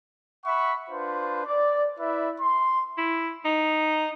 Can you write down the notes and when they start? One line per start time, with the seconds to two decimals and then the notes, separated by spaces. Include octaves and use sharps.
0.45 E5 F#5 B5 C#6
0.90 D4 F4 B4 C5
1.45 D5
1.98 E4 B4 D5 E5
2.40 C6
2.98 E4
3.45 D#4